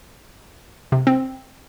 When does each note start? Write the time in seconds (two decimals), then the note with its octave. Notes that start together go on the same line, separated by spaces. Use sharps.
0.92 C3
1.07 C4